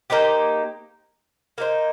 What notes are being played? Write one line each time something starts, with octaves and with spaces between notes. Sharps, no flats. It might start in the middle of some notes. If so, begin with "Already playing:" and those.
A#3 D#4 G4 C5
A#3 D#4 C5